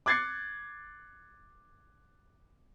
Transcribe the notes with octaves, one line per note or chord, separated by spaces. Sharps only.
D6 F#6 G#6 A6 C7 C#7